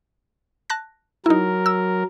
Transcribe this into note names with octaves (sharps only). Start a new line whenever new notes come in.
A5 F#6 A#6
F#3 D#4 E4 A#4
E6